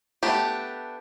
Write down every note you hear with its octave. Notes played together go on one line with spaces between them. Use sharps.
A3 B3 D4 G4